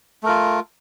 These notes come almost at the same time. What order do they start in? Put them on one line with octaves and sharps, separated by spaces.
A3 A#4 F4